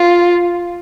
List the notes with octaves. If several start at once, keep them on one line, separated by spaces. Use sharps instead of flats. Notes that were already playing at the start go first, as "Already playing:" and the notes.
Already playing: F4